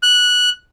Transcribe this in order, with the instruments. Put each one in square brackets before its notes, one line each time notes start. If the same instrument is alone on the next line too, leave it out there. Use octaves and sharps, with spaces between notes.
[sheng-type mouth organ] F#6